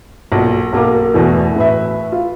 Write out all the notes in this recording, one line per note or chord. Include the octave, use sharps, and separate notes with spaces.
B1 A#2
B1 A#3 A#4 D6
E2 B2 E3 A3
A2 B4 E5
F4